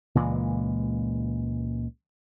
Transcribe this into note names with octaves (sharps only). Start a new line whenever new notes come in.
C#2 A#2 E3 G#3